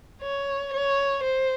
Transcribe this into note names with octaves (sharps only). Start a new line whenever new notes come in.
C#5
C#5
C5